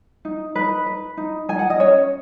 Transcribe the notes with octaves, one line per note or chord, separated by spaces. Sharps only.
D#4
D#4 B4
B4
D#4
D#4 G#5
F#5
D#5
C#4 C#5